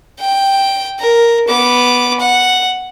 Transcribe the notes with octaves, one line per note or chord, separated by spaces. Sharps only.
G5
A#4
B3 D6
F#5